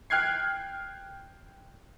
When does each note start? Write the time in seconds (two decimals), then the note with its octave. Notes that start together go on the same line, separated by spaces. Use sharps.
0.10 G5 F6 F#6 G#6 C7